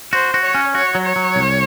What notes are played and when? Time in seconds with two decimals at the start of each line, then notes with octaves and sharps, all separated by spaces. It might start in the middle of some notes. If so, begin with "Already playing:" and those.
0.13 F#4 C5
0.34 F#4
0.44 C#5
0.55 C#4
0.75 F#4 C#5
0.95 F#3
1.05 C#5
1.16 F#3
1.36 C2